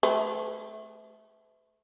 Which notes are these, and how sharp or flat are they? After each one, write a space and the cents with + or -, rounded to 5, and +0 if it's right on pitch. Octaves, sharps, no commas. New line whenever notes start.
A3 -20 B4 +45